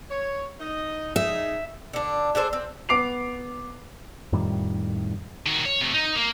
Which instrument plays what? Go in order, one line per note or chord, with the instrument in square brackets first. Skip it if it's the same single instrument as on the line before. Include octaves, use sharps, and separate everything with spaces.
[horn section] C#5
D#4 D#5
[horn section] D#4 G#4 [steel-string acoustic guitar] E5
[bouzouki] D3 D4
D4 G#4 A4 C5
C4
[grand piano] B3 D6 C7 F7
[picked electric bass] F2 A2 D#3 G3
[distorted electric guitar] D#3 F#4
C#5
C3 A3
D#4
A#3